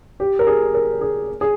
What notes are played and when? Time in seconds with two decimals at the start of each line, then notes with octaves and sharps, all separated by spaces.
0.20 G4
0.39 A#4
0.47 G#4
0.74 A#4
1.01 G#4
1.41 G#4